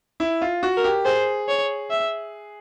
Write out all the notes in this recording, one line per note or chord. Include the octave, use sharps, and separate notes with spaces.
E4
F4
F#4
A#4
G4
G#4 C5
C#5
E5